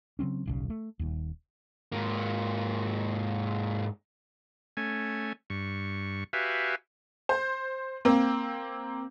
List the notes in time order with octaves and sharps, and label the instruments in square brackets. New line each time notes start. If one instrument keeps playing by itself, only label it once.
[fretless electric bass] C#3 F#3 C4 C#4
D#1 B1 C#3
A3
D#1 D#2
[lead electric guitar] G#2 A#3
[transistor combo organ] A3 C#4 G#5
G2 C#6
F#4 G4 B4 E5 F5 G#5
[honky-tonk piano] C5
A#3 C4